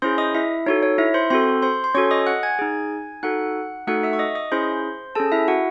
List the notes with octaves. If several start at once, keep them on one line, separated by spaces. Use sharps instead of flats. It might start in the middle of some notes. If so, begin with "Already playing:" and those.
C#4 E4 G#4 C5 C6
D#5 D#6
E4 E5
D#4 F#4 A4 C#5
C#5
E4 E5
C5 C6
C4 F#4 A4 C5 C6
C5 C6
C6
C#4 F#4 A4 C#5 C#6
D#5 D#6
F#5 F#6
G#5 G#6
D#4 G#4
D#4 F#4 A4 F#5 F#6
A3 D#4 F#4 A4 F#5 F#6
E5 E6
C#6
D#5 D#6
D#5 D#6
C#4 E4 G#4 C5 C6
C#4 G#4 A4 A5
E4 E5
F#4 F#5